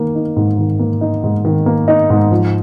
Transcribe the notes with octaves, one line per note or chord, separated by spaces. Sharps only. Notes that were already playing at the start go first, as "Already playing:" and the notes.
Already playing: D#3 A#3
D#4
G#2
D#3
A#3
D#4
G#2
D#3
A#3
D#4
G#2
F3